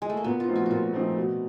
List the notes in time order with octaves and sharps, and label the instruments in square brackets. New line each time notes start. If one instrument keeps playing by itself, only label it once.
[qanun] G#3
A3
A#3
[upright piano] A#2 [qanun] B3
[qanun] F4
[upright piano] F3 A3 C4 D#4
[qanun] F#4
[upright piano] A#2 [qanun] F4 F#4
[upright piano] F3 A3 C4 D#4
B2